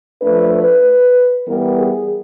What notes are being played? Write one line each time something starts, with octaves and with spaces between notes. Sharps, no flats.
F3 A3 D4 B4
B4
E3 G3 B3 A#4
G#4